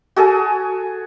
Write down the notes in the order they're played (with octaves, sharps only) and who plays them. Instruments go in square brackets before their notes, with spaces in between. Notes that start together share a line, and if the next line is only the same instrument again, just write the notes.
[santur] F#4 G#4 A4 G#5